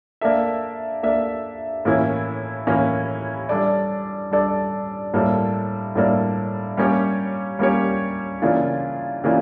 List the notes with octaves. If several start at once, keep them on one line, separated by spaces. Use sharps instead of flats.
A#3 D4 A4 E5
A#3 D4 A4 E5
A2 E3 A#3 C#4 E4
A2 E3 A#3 C#4 E4
G3 D4 A4 D5
G3 D4 A4 D5
A2 G3 A#3 D4 A4
A2 G3 A#3 D4 A4
G3 A#3 C#4 G4 C#5
G3 A#3 C#4 G4 C#5
C#3 E3 A#3 D4 F4
C#3 E3 A#3 D4 F4